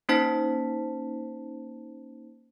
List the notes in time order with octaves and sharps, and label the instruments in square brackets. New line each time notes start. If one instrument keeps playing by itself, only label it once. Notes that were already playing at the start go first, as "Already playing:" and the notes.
[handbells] A#3 C#4 D#4 C5 A5 B6